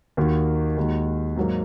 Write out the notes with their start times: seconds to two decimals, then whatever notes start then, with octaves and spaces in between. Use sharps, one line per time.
0.17 D#2 D#3 A#3 D#4 F#4
0.77 D#2 D#3 G#3 D#4 F#4
1.36 G#2 F#3 A#3